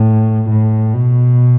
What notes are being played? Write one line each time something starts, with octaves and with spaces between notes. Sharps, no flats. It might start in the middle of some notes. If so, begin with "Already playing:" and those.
Already playing: A2
A2
B2